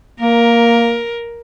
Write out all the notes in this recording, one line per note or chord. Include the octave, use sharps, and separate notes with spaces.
A#3 A#4